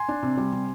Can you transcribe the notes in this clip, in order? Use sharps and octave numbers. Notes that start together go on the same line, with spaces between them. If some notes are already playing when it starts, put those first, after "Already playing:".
Already playing: G#5 C6
D4
C3
G3
C3